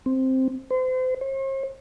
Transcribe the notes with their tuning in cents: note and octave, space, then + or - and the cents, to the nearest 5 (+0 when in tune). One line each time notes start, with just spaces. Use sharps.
C4 +0
C5 -35
C5 +45